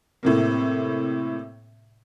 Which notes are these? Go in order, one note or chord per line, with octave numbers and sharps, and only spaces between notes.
A2 C3 A#3